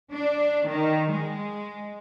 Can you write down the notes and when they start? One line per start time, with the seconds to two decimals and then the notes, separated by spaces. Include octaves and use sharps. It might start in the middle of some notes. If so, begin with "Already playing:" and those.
0.13 D4
0.68 D#3
1.13 G#3